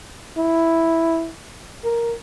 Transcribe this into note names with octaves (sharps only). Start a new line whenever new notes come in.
E4
A#4